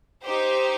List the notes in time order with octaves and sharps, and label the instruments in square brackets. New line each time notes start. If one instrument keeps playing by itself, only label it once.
[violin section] D#4 G4 C5